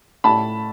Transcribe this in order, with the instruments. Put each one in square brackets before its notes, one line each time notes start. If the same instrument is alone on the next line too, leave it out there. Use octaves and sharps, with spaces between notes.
[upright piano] A2 A5 B5